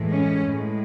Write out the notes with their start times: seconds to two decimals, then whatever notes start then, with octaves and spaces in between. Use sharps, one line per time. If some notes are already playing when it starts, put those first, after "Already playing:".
Already playing: A2 E3 G#3
0.10 C#4
0.43 A2 G#3